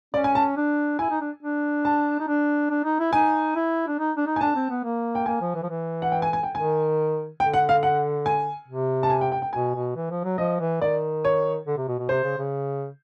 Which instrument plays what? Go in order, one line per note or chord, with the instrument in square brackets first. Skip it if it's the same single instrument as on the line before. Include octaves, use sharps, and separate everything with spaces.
[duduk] C#4 [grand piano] D5
[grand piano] G#5
A5
[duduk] D4
[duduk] E4 [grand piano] G#5
[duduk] D#4
D4
D4
[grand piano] A5
[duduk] D#4
D4
D4
D#4
E4
[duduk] D#4 [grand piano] G#5
[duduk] E4
D4
D#4
D4
D#4
[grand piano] G#5
[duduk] D4 [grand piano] A5
[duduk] C4
B3
A#3
[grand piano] G5
[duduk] A#3 [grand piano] G#5
[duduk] F3
E3
F3
E3
[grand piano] F#5
G5
G#5
G#5
G5
[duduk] D#3 [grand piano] G#5
[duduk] D3 [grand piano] G5
[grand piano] F#5
F5
F#5
G#5
[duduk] C3
[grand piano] A5
G#5
G5
G5
G5
[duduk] B2 [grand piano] G#5
[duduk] B2
E3
F3
F#3
[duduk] F3 [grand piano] D#5
[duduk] E3
[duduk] D#3 [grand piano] D5
[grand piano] C#5
[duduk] D3
C3
B2
B2
[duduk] C3 [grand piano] C5
[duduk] C#3
C#3